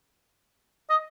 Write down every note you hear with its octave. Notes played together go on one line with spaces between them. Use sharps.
D#5